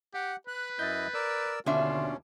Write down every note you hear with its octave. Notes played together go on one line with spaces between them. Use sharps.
G4 F#5
B4 F#6
F#2 E4 D#5 G6 A6
A#4 D5 E6
D#2 B2 D3 C#4 D4 F4 E5 C6